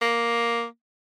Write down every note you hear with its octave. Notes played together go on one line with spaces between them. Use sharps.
A#3